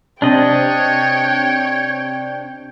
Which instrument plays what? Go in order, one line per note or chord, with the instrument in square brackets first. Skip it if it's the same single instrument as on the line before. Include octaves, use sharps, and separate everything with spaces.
[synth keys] C3 C4 [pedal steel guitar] D4 D#5 [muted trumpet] C#5 [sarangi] G5